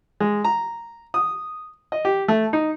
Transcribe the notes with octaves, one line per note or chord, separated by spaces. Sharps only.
G#3
A#5
D#6
D#5
G4
A3
D#4